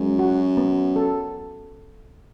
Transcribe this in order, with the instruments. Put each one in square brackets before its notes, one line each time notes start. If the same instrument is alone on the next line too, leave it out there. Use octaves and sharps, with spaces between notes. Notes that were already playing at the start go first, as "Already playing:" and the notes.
Already playing: [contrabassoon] F#2 [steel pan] G#3
[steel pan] F#4
B3
A4